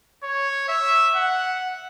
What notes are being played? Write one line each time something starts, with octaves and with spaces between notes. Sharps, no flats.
C#5
E5
F#5